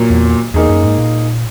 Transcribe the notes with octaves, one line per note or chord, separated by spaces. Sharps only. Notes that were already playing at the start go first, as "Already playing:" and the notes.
Already playing: A#2 F#3 A#3
E2
E2 A#3 D#4 G#4
F#2
G#2
A#2